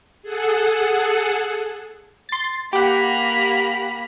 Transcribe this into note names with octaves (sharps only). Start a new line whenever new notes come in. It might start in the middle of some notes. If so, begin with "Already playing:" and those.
G#4 A4 F#5
C6 A6
A#3 G4 F#5 B5